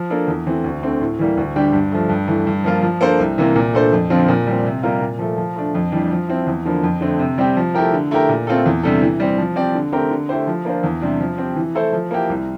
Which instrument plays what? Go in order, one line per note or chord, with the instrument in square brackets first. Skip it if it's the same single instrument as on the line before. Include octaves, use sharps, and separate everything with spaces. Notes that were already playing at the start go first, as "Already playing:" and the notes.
Already playing: [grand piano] F3
A#3 D4 A4
E2
E3 A3 C4
D2
D3 A3 C4
A2
E3 G3 A#3
D2
D3 G3 D4 G4
G2
F3 A3
G2
E3 A3
G2
F3 A#3 F4
F3
A#3 D4 A4 C5
C2
C3 E3 A#3
A#2
A3 D4 A4 C5
F2
D3 F3 C4 F4
A#2
G3 C4
C3
G3 A#3 F4 A#4
A#2
F3 A3
F3
A3 D4
F2
E3 G3 D4
F3
C4 E4
E2
D3 F3 A#3
F2
D3 A3 C4
C3
G3 C4 G4
F3
A3 E4 G4 A#4
D3
A3 E4 G4 A#4
A#2
A3 C4 F4 A4
E2
C3 G3 D4 A4
E3
G3 C4
F3
C4 G4 D5
D3
A3 C4 G4 A#4
D3
A3 E4 G4 C5
F3
A#3 D4 F4 C5
E2
C3 G3 D4
F3
C4 G4
E3
A3 E4 A4 C5
F3
A#3 E4 G4
C2